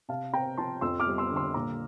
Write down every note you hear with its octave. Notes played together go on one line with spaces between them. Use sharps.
C3 F5 A5
C4 G5 A#5
F3 A5 C6
F2 C6 E6
D6 F6
G3
C6 E6
D3
C6 E6
A#2 A#5 D6